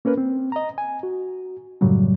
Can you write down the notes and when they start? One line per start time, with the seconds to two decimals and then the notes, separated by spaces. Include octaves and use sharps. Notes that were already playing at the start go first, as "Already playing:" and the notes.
0.05 A#3 C#4 A#4 B4
0.18 C4
0.52 D#5 A#5
0.78 G#5
1.03 F#4
1.81 F#2 A2 C#3 F#3 G3